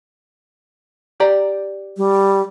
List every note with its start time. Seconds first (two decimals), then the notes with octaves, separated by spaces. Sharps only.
1.20 G4 D5 A#5
1.97 G3